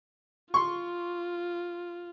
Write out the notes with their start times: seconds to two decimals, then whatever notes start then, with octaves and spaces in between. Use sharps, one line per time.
0.54 F4 C6 C#6